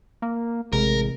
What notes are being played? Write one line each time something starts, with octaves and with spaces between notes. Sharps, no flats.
A#3
A1 C3 G#3 A#4